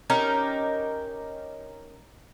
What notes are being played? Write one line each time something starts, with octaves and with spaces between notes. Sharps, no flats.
C#4 D#4 G4 A#4